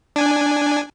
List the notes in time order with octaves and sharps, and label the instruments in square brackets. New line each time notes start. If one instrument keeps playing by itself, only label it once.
[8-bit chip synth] D4 G#5